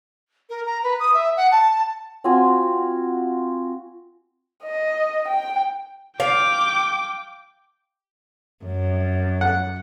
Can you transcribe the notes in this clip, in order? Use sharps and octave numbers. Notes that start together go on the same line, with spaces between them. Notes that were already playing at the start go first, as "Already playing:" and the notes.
A#4
A#5
B4
D#6
E5
F#5
A5
C4 F4 F#4 G#5
D#5
G5
F5 G5 D6
F#2
F#5